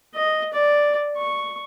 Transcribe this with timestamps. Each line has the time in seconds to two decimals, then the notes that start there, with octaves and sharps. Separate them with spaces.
0.14 D#5
0.53 D5
1.17 C#6